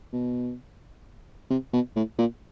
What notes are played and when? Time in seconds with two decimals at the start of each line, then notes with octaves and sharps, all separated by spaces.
0.12 B2
1.50 C3
1.73 B2
1.96 A2
2.18 A#2